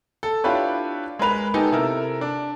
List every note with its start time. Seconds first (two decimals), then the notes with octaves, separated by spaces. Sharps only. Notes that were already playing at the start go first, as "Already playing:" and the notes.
0.23 A4
0.44 D4 E4 F4 G4 B4 C#5
1.19 G#3 A#4 B4 F7
1.54 B3 D#4 G4 A4 G#5 A5
1.72 C3 E4 A4 A#4
2.21 D4